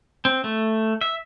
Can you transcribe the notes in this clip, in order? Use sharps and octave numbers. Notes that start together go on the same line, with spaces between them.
C4
A3
E5